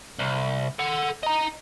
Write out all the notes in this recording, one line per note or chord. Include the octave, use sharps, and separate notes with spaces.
C2
A4 F#5
D#5 A#5